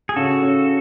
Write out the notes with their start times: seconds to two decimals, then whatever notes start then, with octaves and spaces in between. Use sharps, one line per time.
0.09 G#4
0.16 C#3 F#4 A4
0.42 C#4